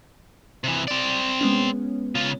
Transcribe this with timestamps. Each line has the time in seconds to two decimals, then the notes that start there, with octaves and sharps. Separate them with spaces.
0.64 C3 E3
0.88 C4 D5
1.41 G#3 B3 C#4
2.15 C#3 F4